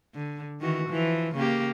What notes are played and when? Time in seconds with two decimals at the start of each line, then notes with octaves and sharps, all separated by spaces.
0.15 D3
0.61 D#3 E3 F#4
0.89 E3 F3
1.35 C#3 A#3 G4